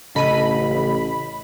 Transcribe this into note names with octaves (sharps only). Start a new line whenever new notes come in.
A1 C#3 A4 D#5 B5 D#7